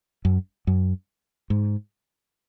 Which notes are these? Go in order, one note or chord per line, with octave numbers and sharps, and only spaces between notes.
F#2
F#2
G#2